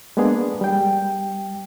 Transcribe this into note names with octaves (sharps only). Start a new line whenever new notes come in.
G#3 A#3 B3 D4 G#4
G3 G5